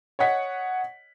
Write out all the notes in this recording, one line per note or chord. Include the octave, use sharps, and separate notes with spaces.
C#5 D#5 F#5 B6